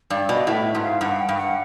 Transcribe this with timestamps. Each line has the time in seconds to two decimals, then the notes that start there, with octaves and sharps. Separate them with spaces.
0.10 G2 D5
0.29 B2 D#5
0.47 A2 E5
0.65 E5
0.75 G#2
0.83 F5
1.01 G2 F#5
1.19 G5
1.29 G2
1.37 F#5